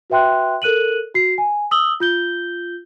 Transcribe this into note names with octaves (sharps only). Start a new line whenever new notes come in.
F#4 B4 E5 G5 C6 F#6
A4 A#4 F#6 D#7 F#7
F#4 C7
G#5
D#6 E6 F#7 G7
F4 G6 G7